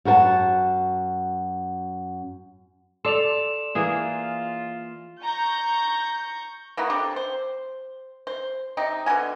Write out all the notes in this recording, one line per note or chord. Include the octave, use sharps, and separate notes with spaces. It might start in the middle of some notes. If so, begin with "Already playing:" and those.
F#2 F#4 A#4 F#5 A5
A4 D5 C6 E7 F7
E3 A#3 F4 G#4
A#5 C#6 G6
A#3 B3 E4 F#4
C4 D4 G4 A4
C5
C5
C3 C4 D#4
B2 D3 F#4 G#5